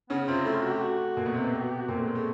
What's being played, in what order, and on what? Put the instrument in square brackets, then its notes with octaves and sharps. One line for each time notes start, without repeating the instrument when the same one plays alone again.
[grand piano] C#3 C#4 [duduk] B3
[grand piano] C3 C4 [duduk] F4
[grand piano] A3 [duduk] E4
[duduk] F4
F#4
G4
F#4
[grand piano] A#2 A#3
B2 B3
C3 C4
B2 B3
[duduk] G4
F#4
G4
F#4
[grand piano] A#2 A#3 [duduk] C4
[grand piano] A3
G#3
A3